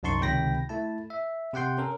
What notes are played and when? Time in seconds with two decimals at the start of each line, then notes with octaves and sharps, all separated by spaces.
0.03 C2 F#2 D#4 A5 C6 C#6
0.20 C#2 C3 D#3 G5 B5 A#6
0.69 A3 E4 A5
1.10 E5
1.53 C3 G4 F#5 G5 C6
1.78 C#4 A4 A#4